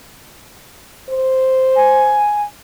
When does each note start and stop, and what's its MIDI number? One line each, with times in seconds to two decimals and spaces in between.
1.10 2.23 72
1.76 2.42 80